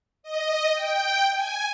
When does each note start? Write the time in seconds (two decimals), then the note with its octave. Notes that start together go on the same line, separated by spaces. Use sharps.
0.23 D#5
0.73 G5
1.33 G#5